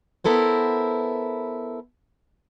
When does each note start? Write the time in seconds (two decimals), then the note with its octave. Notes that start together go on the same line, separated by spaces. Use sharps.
0.24 B3 E4 A4 A#4 C5